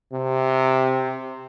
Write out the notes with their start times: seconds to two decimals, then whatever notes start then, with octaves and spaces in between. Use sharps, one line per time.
0.13 C3